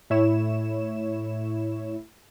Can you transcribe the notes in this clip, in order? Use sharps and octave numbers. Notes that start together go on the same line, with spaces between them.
A2 E4 C#5 E7